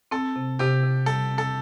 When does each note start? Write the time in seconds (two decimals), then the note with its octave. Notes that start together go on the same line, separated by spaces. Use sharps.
0.11 C4 A4
0.36 C3
0.59 C3 G4
0.84 C3
1.06 G3 A4
1.30 C4
1.38 A4